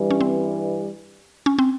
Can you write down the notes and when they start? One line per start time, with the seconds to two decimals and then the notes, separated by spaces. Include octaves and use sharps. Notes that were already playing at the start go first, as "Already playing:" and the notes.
Already playing: G2 E3 G3
0.10 C#4
0.21 C4
1.46 C#4
1.59 C4